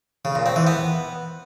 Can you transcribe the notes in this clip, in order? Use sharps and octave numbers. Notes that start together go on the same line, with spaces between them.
C#3
A#2
C4
E3
B3